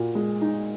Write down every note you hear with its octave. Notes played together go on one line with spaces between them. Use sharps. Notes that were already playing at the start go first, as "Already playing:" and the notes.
Already playing: A#2 F#4
G#3
D#4